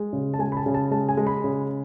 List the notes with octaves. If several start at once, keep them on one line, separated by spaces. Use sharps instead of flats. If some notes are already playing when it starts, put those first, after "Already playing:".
Already playing: G#3
C#3
A5
G#3 G#5
B5
A5
C#3
A5
G#3 A5
G#5
G#3
B5
C#3